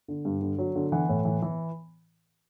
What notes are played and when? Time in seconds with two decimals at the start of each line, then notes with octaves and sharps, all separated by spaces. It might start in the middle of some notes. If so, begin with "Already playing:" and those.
0.08 D3
0.25 G2
0.41 D3
0.58 F#3
0.75 D3
0.92 E3 F#5
1.09 A2
1.25 E3
1.42 E3